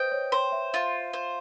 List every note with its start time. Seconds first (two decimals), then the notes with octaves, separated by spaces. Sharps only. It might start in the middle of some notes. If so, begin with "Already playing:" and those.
Already playing: B4 C5 D#5 G5
0.12 C#5
0.32 C5 C#5
0.52 E5
0.73 F4 E5
1.13 C5